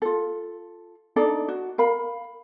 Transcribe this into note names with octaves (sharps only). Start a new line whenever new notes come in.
F4 A4
D4 D#4 A4 D5
F#4
A#4 F5 B5